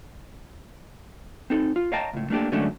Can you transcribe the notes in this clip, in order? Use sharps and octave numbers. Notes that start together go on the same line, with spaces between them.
C4 D#4 A4
F4
C#5 D#5 F5 G5 A5 A#5
C#2 A2
A3 A#3 D4 G4 A4
D3 F#3 G#3 A3 C#4 D4